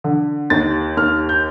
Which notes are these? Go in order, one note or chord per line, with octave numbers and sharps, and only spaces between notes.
D3
D#2 A6
D#2 F6
G6